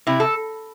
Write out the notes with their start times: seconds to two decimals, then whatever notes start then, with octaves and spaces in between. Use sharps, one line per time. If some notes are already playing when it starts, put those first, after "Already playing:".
0.07 C3 E4
0.20 A4